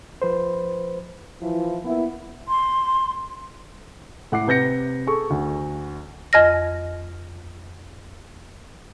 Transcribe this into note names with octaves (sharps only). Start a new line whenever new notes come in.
F3 B4 C5
E3 F3 E4
A#3 B3 E4
C6
A2 F#5 D6 C7
C3 B4 G6 A#6 C#7
G#4 A4 C#6
D2
F2 D#5 F6 A#6